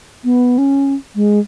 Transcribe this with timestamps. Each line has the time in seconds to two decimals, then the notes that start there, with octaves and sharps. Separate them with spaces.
0.24 B3
0.58 C#4
1.16 G#3